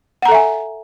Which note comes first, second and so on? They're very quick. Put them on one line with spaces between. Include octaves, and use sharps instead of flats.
F#5 A#5 A4 E5 G#5